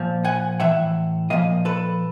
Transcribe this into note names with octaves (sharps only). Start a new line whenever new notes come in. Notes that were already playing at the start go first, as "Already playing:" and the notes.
Already playing: A#2 F3
F#5 G#5
A2 E3 E5 F#5
A#2 F3 D#5 F5
A4 B4